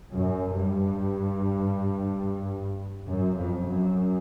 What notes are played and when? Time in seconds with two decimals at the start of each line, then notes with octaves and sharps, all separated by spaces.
0.11 F#2
0.55 G2
3.07 F#2
3.36 F2
3.66 F#2